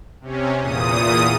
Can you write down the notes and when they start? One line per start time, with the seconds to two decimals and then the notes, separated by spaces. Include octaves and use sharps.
0.21 C3 C#4
0.59 E2 A#2 D#6